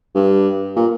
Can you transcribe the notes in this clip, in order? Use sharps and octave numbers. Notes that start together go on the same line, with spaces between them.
G2
A#2